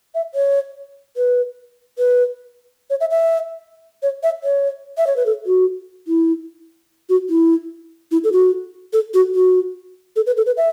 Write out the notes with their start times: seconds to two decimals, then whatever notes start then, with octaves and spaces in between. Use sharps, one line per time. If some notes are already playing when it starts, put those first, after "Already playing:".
0.15 E5
0.34 C#5
1.17 B4
1.98 B4
2.90 C#5
3.01 E5
3.11 E5
4.03 C#5
4.23 E5
4.44 C#5
4.98 E5
5.07 C#5
5.16 B4
5.26 A4
5.46 F#4
6.07 E4
7.09 F#4
7.30 E4
8.11 E4
8.24 A4
8.32 F#4
8.93 A4
9.14 F#4
9.35 F#4
10.16 A4
10.26 B4
10.37 A4
10.46 B4
10.57 E5